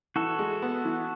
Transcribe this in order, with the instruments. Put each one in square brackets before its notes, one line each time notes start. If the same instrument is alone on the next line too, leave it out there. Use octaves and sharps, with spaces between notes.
[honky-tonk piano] E3 [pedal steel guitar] F#4 A4
[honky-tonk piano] G#3
B3
E3